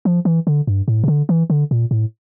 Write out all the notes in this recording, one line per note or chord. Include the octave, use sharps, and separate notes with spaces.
F3
E3
D3
G2
A2
C3
D3
E3
D3
A#2
A2